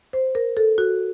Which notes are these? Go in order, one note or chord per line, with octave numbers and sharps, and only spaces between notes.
C5
A#4
A4
F#4